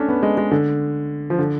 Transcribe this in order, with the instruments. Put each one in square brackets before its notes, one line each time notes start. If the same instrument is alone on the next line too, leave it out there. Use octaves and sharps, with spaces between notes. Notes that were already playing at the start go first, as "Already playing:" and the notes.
Already playing: [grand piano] A3 C#4 D4
B3
G#3
G#3
D3
F3
D3